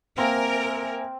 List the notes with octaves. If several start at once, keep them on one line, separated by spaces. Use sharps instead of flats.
A#3 C4 A#4 C5 E5 G#5